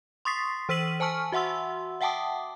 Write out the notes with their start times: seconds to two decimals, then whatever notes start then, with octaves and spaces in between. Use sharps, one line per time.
0.25 C6 C#6 D#6 A6 B6 C7
0.69 E3 C5 E6 B6 D#7 F#7
1.00 C5 G#5 A5 C#6 F6
1.32 F#4 E5 F#5 C6 E6
2.01 E5 F#5 G5 A5 D6 D#6